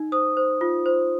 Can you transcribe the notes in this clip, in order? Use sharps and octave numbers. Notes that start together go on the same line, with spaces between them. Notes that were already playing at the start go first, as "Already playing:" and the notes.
Already playing: D#4
C5 D#6
C5
F4
C5